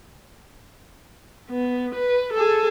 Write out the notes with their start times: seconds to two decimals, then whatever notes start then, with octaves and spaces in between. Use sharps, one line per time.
1.50 B3
1.95 B4
2.33 G#4 A4